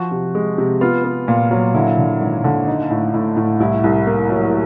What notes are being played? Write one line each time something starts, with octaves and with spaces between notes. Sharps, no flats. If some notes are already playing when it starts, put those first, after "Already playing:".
Already playing: F3 F#4
C3
G#3
C3
B3 F4
B3
A#2
F#3
D3 E4
D3
G#1
D3
D#4
A2
A2
A2
C2 E4
C2
A#3
F#3